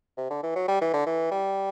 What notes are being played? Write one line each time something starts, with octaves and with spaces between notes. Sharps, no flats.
C3
D3
E3
F#3
G3
E3
D3
E3
G3